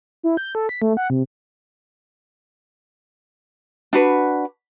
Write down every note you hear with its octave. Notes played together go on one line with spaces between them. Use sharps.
E4
G6
A4
B6
A3
F#5
C3
D4 F#4 B4